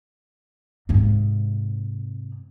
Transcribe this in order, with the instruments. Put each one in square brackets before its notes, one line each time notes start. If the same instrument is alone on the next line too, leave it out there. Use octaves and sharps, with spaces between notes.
[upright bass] G#2 C3